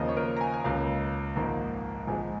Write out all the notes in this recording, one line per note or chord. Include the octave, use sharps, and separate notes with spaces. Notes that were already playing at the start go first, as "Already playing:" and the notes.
Already playing: D#2 C#3 F3 A#3 D#5
C#5
A#4
A#5
G#5
G#5
C#2 C#3 A#3 F5
A#1 G#2 D#3 A#3
A#1 G#2 G#3 G#5